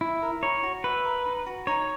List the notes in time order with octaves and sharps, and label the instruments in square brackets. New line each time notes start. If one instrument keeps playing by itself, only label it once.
[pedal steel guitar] E4 [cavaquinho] E5
[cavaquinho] A#4
[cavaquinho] D#4 [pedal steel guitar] C#5
[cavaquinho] F#4
[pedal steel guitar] B4 [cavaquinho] E5
[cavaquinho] A#4
D#4
F#4
[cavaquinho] D#4 [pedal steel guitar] C#5